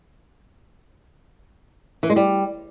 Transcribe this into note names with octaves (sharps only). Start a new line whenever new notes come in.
E3
G#3
G3